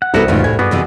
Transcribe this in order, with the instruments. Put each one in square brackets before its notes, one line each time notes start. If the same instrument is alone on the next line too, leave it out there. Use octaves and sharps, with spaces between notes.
[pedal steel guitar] F#5
[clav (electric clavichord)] C2 F#4 [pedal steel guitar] G3 E4 [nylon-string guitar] B3 A4 A#4
[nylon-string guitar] E2 G#2 C#3 [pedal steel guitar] A3 F4
[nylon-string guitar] A2 [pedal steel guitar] G#5
[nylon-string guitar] G2 [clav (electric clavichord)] B3 [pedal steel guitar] F#4 G#4 D5
[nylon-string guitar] F2 C3 E3